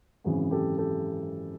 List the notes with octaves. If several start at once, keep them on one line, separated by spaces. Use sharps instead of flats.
G#1 F#2 C#3 E3 F#4 G#4
G4 A4
G4 A4